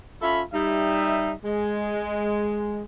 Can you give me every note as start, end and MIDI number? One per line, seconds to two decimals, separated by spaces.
0.22 0.42 61
0.22 0.42 65
0.22 0.42 69
0.22 0.42 76
0.22 0.42 83
0.54 1.32 55
0.54 1.32 63
0.54 1.32 76
1.44 2.83 56